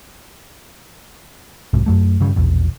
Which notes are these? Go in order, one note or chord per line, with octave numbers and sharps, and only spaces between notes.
B1 G#2 C3
F#2 F#3 A3
G2 C#3 G3
A#1 E2 B2